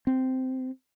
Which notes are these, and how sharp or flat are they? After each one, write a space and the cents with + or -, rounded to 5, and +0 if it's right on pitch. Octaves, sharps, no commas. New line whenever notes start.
C4 -10